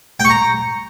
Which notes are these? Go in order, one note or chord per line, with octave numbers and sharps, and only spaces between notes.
G5
C#6
A#5